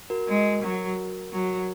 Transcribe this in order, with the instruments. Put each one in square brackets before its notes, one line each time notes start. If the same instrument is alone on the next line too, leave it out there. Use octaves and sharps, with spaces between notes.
[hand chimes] F#4 A#4
[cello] G#3
F#3
F#3